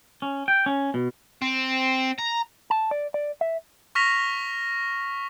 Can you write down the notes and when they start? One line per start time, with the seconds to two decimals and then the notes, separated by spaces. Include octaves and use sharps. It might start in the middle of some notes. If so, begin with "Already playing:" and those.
0.22 C#4
0.48 G5
0.66 C#4
0.94 B2
1.42 C4
2.19 A#5
2.70 A5
2.91 D5
3.14 D5
3.41 E5
3.95 C#6 F6 A#6 B6 F7